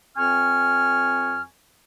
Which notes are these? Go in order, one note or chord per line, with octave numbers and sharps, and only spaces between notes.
F2 C4 G#5 C#6 F6